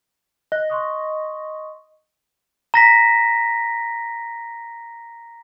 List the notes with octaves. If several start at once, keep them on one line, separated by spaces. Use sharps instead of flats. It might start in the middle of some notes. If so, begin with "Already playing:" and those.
D#5 F#6
C6 C#6 D#6
A#5 A#6 B6